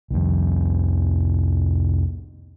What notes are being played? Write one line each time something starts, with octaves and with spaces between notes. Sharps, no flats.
C2 F2